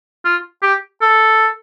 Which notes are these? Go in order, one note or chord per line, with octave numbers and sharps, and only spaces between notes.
F4
G4
A4